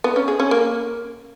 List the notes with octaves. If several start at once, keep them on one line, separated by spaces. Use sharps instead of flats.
B3
C#4
G#4
C#4
A#3